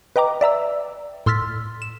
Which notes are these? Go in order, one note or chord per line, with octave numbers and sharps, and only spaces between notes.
B4 D#5 G5 A#5 D6
D5 E5 A#5 E6
A2 C6 E6 F6 A6 B6
E7